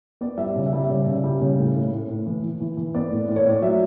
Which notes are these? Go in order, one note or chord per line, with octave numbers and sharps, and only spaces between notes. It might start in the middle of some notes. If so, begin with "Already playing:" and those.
B3 D5
G3 E5
D5
C#3
E5
G3
E5
C#3 D5
C#3
E5
G3
C#3
A2
A2
A2
A2
E3
E3
E3
E3
B3 D5
A2
A2
C#5
A2 D5
F#3 E5